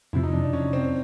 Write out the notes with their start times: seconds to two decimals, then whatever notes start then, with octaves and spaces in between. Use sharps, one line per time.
0.13 F2 C3 F3 E4
0.23 D#4
0.33 D4
0.43 D4
0.53 C#4
0.73 C4